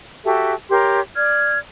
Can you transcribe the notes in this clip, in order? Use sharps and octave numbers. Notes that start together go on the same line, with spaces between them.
F#4 G4 A4 E5
G4 A#4 C#5 C6
D5 F6 G#6